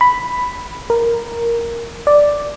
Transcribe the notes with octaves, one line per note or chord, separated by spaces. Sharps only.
B5
A#4
D5